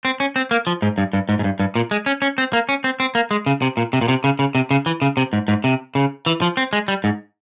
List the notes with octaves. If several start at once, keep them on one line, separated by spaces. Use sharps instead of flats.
C4
C#4
C4
A#3
F3
G#2
G2
G2
G#2
G#2
G2
G2
A#2
G#3
C#4
C#4
C4
A#3
C#4
C4
C4
A#3
G#3
C#3
C3
A#2
C3
A#2
C3
C#3
C#3
C3
C#3
E3
C#3
C3
G#2
G#2
C3
C#3
E3
F3
C4
G#3
G3
G#2